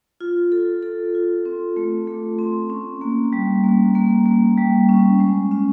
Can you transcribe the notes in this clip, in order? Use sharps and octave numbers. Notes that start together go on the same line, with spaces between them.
F4
A4
A4
F4
C4
A3
A3
C4
C#4
A#3
G3
A#3
A#3
A#3
G3
C#4
G#3
C#4